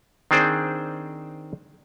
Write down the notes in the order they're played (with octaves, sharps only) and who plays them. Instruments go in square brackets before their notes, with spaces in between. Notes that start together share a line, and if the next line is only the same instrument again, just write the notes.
[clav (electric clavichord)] D#3 C4 D4 G#4 C5 D5